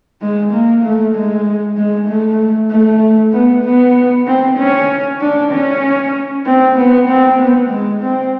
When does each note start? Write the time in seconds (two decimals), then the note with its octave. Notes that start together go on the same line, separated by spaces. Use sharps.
0.21 G#3
0.52 A#3
0.84 A3
1.14 G#3
1.77 G#3
2.08 A3
2.70 A3
3.33 B3
3.64 B3
4.27 C4
4.58 C#4
5.20 D4
5.51 C#4
6.46 C4
6.77 B3
7.08 C4
7.39 B3
7.70 G#3
8.02 C4